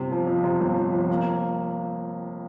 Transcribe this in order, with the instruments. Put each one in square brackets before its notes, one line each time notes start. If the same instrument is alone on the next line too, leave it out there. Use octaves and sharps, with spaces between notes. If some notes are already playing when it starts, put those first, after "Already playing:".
Already playing: [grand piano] G1 C3
F3
F2
C3
G1
F3
F2
A#3